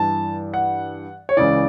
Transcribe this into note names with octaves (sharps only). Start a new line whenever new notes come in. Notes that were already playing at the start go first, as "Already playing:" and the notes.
Already playing: G2 E3 A5
F#5
C#5
C#2 C#3 E3 D5